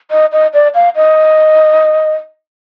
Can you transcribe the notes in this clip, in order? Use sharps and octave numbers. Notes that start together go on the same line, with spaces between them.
D#5
D#5
D5
F5
D#5